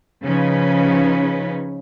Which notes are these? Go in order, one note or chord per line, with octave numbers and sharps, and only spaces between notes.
C#3 F3 C#4 D#4 B4